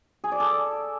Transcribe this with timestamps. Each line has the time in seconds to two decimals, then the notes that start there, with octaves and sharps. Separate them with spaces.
0.24 G#4
0.32 D5
0.40 A4